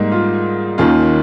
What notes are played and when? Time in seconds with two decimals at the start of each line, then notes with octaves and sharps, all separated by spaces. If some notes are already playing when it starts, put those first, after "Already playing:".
Already playing: G#2 G3 A#3 D#4
0.12 F4
0.78 D#2 D#3 A#3 C#4 F4